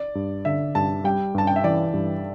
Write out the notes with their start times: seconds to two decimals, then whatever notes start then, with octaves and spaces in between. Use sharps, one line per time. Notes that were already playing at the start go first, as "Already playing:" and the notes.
Already playing: D5
0.15 G2
0.45 D3 E5
0.75 G2 A5
1.04 G3 G5
1.35 G2 A5
1.47 G5
1.56 E5
1.64 E3 D5
1.94 G2